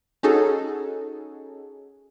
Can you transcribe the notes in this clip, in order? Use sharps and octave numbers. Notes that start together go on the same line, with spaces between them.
C#4 D#4 F#4 G#4 A4